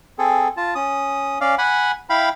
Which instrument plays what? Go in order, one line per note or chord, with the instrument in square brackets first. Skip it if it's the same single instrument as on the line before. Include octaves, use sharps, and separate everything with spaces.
[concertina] C4 G#4 A4
F4 A5
C#4 D#6
C#4 D5 F5
F#5 G#5 B5
E4 F5 G5 B5